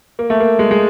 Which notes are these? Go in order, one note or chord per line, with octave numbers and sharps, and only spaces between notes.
A#3
A3
A#3
G#3
G#3